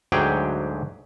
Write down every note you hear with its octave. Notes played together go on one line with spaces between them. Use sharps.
D2 G#2 F#3 G4 G#4 G5